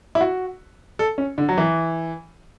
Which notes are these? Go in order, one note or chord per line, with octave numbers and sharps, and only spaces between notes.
E4
F#4
A4
C#4
D3
F#3
E3